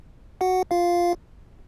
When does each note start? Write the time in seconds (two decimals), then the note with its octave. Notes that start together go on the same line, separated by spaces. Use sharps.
0.41 F#4 F#5
0.71 F4 F5